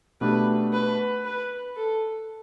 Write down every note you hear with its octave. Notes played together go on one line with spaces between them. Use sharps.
B2 A3 D4 G4 B4
B4
B4
A4